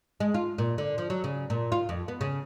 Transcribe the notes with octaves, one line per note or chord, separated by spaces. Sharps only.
G#3
F4
A#2
D3
F3
F#3
C#3
A#2
F4
F2
B3
C#3